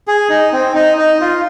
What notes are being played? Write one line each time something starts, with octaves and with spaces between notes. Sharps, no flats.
G#4
D#4
C4
D#4
D#4
F4